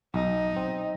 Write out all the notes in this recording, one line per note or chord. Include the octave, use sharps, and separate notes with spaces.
B1 D#4
C4